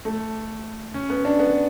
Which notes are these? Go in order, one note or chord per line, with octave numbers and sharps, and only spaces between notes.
A3
C#4
B3
D4
B3